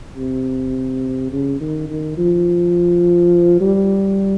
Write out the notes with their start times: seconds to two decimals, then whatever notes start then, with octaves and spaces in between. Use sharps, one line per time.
0.16 C3
1.32 C#3
1.61 D#3
1.89 D#3
2.17 F3
3.61 G3